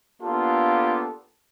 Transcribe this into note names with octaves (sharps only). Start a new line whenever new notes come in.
A#3 B3 D4 F4 G4 A4